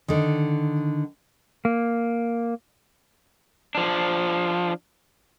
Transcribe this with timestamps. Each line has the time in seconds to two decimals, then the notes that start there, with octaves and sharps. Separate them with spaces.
0.08 D3 D#3
1.65 A#3
3.75 F3 D4